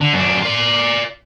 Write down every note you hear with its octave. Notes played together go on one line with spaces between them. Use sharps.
D3
F#2 D4
F4 D5